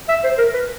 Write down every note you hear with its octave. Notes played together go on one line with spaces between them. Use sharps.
E5
C5
A#4
B4